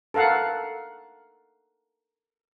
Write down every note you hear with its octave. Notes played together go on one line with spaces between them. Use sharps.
A4 A#4 F5 F#5